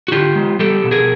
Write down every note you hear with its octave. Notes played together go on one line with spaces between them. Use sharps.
F#4
D3 F4 G4
G#3
G3 G4 A4
B2
G#4 A#4